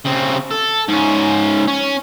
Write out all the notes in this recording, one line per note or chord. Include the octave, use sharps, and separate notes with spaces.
C#3 C4
A4
G#2 C#4
C#4